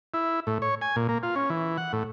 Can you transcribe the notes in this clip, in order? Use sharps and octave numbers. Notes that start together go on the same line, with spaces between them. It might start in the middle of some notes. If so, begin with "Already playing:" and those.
E4
A2
C#5
G#5
A#2
A#3
F4
C#4
E3
F#5
A2